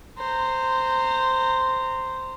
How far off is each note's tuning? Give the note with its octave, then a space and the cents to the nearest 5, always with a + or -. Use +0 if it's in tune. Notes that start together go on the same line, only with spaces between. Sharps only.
C5 -5 A#5 -20